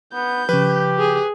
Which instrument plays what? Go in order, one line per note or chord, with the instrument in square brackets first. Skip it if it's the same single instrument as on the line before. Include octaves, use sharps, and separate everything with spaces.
[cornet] B3 [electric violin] G6
[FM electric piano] C#3 F3 [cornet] G4 [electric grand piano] B4
[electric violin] G#4